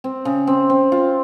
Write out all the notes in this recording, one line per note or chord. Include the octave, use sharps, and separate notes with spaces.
C4
C#3
C4
C4
F4